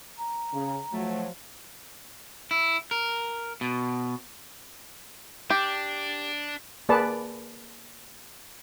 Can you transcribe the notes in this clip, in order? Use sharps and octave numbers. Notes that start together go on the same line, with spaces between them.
A#5
C#3
F3 F#3 A3
E4
A#4
B2
D4 G4
A#3 G#4 B4 D5 A5